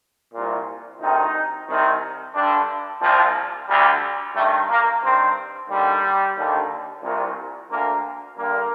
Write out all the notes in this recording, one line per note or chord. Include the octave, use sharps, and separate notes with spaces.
C2 A#2
D2 C3 D#3 D#4
C2 C3 D#3
G2 D3 D4
C2 A#2 F3
D2 D3 G3
G2 D#3 A3
A#3
G2 D#3 C4
D#2 D3 G3
D#2 D3
C2 A#2
D2 D3 A#3
G2 D3 A#3